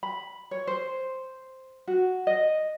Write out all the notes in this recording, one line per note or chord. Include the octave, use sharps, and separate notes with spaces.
B5
C#5
C5
F#4
D#5